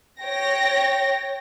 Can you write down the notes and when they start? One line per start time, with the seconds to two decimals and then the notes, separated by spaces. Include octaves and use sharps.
0.21 C#5 G5 A#6